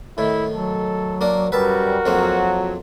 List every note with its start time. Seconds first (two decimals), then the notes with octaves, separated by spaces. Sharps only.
0.18 A2 D#3 E4
0.54 F#3 A4
1.21 A#3 D4 A#4
1.52 F#2 G3 F#4 A#4 B4 E5 A5
2.06 F2 F3 F#3 A#3 C4